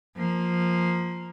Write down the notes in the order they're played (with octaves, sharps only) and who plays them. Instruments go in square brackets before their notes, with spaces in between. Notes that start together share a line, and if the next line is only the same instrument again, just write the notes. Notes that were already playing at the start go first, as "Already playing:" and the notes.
[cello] F3 A#3